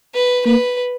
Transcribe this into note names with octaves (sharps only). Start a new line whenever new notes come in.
B4
A#3 B4